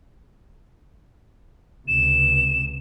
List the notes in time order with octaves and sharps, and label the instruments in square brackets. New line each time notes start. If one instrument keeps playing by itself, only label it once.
[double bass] C#2 C3 [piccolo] E7